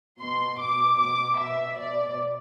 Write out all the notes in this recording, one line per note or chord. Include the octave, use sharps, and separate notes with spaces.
B2 C6
B2 D6
B2 D6
B2 E5
B2 D5